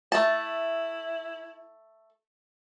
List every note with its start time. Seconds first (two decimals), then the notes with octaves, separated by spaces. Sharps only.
0.12 A3 E4 A5